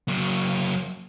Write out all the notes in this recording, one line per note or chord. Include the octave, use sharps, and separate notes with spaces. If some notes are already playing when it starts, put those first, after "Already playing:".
F#3 A#3